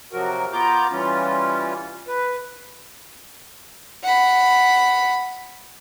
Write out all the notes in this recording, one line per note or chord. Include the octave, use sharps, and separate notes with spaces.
C3 F3 F#3 F#4 A#4
B3 F4 A#5 D6 G6
E3 G3 C#4 F4
B4
F#5 B5